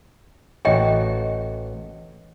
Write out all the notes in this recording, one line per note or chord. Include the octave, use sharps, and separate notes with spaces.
A1 F#4 C#5 D#5 G5